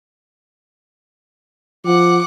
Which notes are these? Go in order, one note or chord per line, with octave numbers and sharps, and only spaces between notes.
F3 F#5 D6